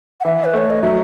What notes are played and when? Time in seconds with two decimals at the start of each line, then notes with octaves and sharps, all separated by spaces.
0.20 F#5
0.25 E3 E5
0.44 B4
0.53 A3 C#5
0.70 D#5
0.82 F#3 E5